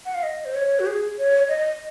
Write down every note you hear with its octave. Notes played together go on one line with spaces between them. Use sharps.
F#5
F5
D#5
C5
C#5
F#4
G#4
C#5
D#5